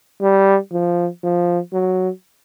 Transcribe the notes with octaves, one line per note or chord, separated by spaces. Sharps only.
G3
F3
F3
F#3